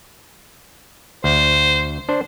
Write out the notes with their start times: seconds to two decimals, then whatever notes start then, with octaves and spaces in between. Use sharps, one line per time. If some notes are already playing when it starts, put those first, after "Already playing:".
1.24 D2 C5
2.09 D4 C5